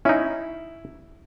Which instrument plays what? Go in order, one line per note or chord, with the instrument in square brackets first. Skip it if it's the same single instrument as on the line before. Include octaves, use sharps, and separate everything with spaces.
[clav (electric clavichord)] C#4 D#4 [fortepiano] E4